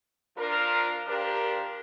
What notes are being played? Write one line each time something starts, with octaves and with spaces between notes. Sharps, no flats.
F3 D4 F4 A#4
F3 D4 G4 A#4